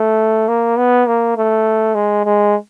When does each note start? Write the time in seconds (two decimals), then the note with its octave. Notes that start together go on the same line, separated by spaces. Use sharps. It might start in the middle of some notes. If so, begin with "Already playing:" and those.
Already playing: A3
0.48 A#3
0.77 B3
1.07 A#3
1.37 A3
1.95 G#3
2.25 G#3